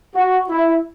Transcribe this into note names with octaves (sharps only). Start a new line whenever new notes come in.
F#4
E4